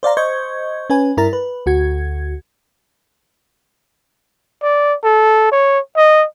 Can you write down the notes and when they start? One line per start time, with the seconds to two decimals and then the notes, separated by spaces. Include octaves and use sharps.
0.03 C5 D5 F5 A#5
0.17 C5 D#5 C#6 G6 G#6
0.90 C#4 B4 G#5
1.17 G2 E4 A#4 A#5 A6
1.33 B4
1.66 D2 F#4 G#6
4.62 D5
5.04 A4
5.51 C#5
5.96 D#5